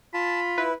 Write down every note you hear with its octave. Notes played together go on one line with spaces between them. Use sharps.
F4 A5 B5
E4 B4